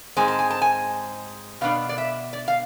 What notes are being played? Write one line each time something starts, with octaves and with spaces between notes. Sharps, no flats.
G#2 G#3 C4 G#5
A5
G#5
A5
G#5
B2 B3 D4 F5
D5
E5
D5
F5